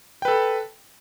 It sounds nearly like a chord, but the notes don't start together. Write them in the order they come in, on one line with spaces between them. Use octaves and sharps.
G5 B4 A4